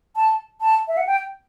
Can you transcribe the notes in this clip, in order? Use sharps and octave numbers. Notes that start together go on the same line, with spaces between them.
A5
A5
E5
F#5
G5